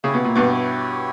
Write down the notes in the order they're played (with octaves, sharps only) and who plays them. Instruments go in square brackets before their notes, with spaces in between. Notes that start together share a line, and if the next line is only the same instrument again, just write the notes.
[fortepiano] C#3 [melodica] E4 G4 C#5 E5
[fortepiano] B2
A#2
G2 B2